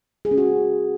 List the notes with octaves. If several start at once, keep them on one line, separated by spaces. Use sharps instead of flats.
G#4
C#4
F#4